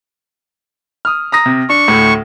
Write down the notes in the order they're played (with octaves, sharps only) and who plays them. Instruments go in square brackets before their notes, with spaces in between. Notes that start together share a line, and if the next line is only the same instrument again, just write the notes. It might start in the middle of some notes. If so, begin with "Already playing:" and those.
[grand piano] D#6 F6
A#5 D#6 A#6
C3
[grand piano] D4 [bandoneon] C#6
[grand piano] D2 A2